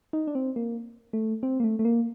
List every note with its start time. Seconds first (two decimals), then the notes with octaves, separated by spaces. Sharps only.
0.13 D#4
0.27 D4
0.35 C4
0.56 A#3
1.13 A3
1.43 C4
1.60 A#3
1.64 A3
1.79 A3
1.85 A#3